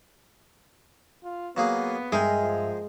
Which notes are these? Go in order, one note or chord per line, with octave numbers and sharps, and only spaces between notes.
F4
F#3 A#3 B3 G#4
G2 G#3 G#4 A#4 E5 G5
F3